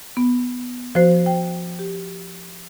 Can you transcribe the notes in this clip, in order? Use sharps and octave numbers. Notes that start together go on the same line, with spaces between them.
B3
F3 F#4 C5
G5
G4